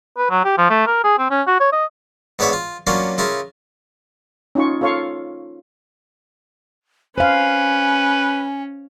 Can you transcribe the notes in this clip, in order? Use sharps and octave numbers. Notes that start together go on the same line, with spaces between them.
B4
F#3
G4
F3
A3
A#4
G#4
C4
C#4
F#4
C#5
D#5
G#2 B3 D4 C#5 E5 B5
F4
F#3 A#3 C#4 D4 F4
C#3 E4 F4 A#4
C#4 D#4 F4 C#6
F4 A4 C#5 F5 C#6
C#4 B4 C5 F5 G#5